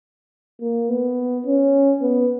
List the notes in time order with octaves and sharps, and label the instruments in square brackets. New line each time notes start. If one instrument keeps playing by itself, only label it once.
[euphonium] A#3
B3
C#4
B3